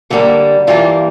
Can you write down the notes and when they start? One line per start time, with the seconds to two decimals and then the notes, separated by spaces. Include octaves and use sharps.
0.10 G2 D3 G3 A#3
0.67 G2 E3 G3 A#3 F4